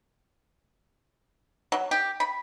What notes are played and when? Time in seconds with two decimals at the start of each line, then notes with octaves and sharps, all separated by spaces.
1.72 F#3
1.91 G4
2.20 B5